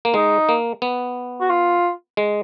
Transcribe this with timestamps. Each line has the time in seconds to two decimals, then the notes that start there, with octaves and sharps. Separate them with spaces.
0.05 A#3
0.14 G#3 D#4
0.49 A#3
0.82 B3
1.40 F#4
1.50 F4
2.17 G#3